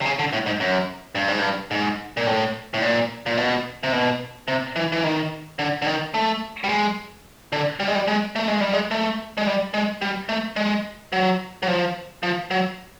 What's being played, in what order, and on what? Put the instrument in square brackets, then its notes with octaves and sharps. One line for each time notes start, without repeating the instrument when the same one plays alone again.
[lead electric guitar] C3
C#3
D3
A2
G#2
F#2
G2
G#2
G2
G#2
A#2
A2
A2
A#2
A#2
B2
C3
B2
C3
E3
E3
D#3
D3
D3
D#3
A3
G3
G#3
D3
G3
G#3
G3
G#3
A3
G#3
G3
G#3
A3
G#3
G3
G#3
G3
A3
G#3
F#3
F#3
F3
F3
F#3